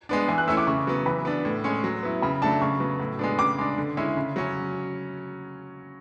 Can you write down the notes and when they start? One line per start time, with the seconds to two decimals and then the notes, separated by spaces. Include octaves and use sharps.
0.09 G#3 B3 D4
0.28 E3 G#5
0.38 F#6
0.48 A3 C#4 E4 E6
0.57 D6
0.67 C#3 C#6
0.87 F#3 B3
1.06 E3 B5
1.25 B3 D4
1.45 A2
1.64 G#3 C#4
1.84 F#3
2.03 B3 E4
2.22 C#3 B5
2.42 F#3 A3 D4 A5
2.62 C#3 C#6
2.80 F#3 B3
2.99 A2
3.19 G#3 B3 D4
3.39 C#3 D6
3.58 G#3 D4
3.78 D3
3.97 G#3 C#4 E4
4.17 C#3
4.36 F#3 C#4